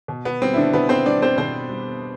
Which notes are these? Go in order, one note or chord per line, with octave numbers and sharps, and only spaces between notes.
B2
B3
G3 C4
E4
D3 D4
B2 B3 B4
C4 C5
G3 D4 D5
C4 C5
B2 C4 C5
G3